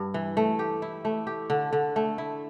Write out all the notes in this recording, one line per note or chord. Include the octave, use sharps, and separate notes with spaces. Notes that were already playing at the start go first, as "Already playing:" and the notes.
Already playing: G2
E3
A3
G4
E4
A3
G4
D3
D3
A3
E4